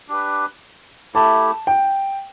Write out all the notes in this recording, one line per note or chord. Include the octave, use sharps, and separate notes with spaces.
D4 G4 B4
A3 E4 G4 A5
G5